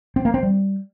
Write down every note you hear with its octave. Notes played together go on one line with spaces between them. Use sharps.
C4
A#3
C4
G3